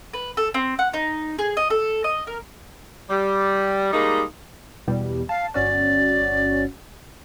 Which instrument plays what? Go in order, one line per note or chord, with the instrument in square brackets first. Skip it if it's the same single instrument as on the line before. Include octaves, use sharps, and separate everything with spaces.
[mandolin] B4
A4
C4
F#5
D#4
G#4
D#5
A4
D#5
A#4
[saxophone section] G3
G3 G#3 A#3 D#4
[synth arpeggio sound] E2 B2 G3
[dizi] F5 [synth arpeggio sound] A5
[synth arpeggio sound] G1 C#4 F#4 [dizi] D5